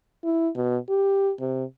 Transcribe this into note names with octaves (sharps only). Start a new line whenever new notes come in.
E4
B2
G4
C3